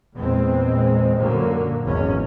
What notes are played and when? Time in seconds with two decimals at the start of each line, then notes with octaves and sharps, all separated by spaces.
0.16 E2 A#2 G#3 C4
1.19 F#2 A#2 D3 F#3 A#3
1.84 G#1 E2 C#4